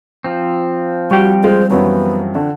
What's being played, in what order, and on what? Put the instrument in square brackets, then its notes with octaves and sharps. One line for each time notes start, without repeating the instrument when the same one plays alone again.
[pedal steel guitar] F3 C4
[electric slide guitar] G3 G4 G5 [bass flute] F#4 [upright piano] C#6
[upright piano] G#3 F4 [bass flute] C5
[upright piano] F#2 E3 F#3 [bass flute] B3
[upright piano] D3 [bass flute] D4